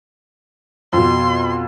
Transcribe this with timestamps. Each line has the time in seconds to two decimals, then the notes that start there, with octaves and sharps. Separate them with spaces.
0.93 F2 B2 C6